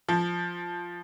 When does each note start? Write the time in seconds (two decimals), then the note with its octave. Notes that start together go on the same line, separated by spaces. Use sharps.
0.09 F3